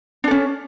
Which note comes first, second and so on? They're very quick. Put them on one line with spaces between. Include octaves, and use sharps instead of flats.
D4 A4 C#4